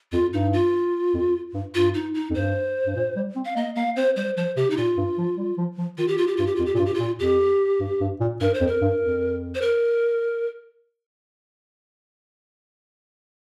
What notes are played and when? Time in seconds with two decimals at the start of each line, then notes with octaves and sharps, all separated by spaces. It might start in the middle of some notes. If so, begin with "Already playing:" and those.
0.12 F2 F4
0.33 G2 D#4
0.53 F4
1.14 F2
1.54 G2
1.74 G2 F4
1.94 D#4
2.14 D#4
2.30 F2
2.35 G2 C5
2.86 G2
2.96 A#2
3.16 G3
3.36 C4
3.45 F5
3.56 A#3 D#5
3.76 A#3 F5
3.96 C4 C5
4.16 G3 C5
4.37 F3 C5
4.57 C3 G4
4.70 D#4
4.77 A#2 F4
4.97 G2
5.18 F3
5.37 G3
5.58 F3
5.78 F3
5.98 D#3 F4
6.08 G4
6.18 F4
6.27 G4
6.37 G2 F4
6.47 G4
6.56 F2 F4
6.66 G4
6.75 G2 A#2 F4
6.86 G4
6.94 F4
6.99 A#2
7.19 F2 G4
7.80 G2
8.01 G2
8.20 A#2
8.41 G2 A#4
8.54 C5
8.61 F2
8.67 A#4
8.81 G2
9.01 F2
9.55 C5
9.62 A#4